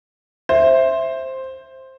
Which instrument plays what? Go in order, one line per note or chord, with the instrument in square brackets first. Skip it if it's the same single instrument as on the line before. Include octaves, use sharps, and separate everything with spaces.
[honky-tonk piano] C5 [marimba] E5